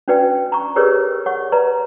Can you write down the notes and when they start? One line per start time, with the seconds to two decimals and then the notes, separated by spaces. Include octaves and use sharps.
0.08 C#4 D4 F#4 B4 D5 G5
0.52 A#5 C#6
0.76 G4 G#4 A#4 B4 C#5 D5
1.26 C#5 F#5 C#6
1.52 B4 D5 A#5